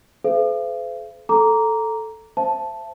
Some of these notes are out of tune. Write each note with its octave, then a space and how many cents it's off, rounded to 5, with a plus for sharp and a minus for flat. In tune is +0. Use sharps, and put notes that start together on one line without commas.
A4 -45 C5 -40 F5 -45
A4 +0 A#5 +0 D6 -20
C5 +0 E5 +30 A5 +0